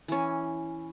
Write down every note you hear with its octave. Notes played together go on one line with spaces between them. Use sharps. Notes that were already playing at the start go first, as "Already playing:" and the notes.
E3 C#4